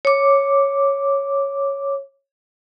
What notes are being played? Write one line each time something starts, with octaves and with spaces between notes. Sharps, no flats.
C#5 D6